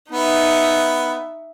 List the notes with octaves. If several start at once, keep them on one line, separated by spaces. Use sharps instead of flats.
B3 D#4 E5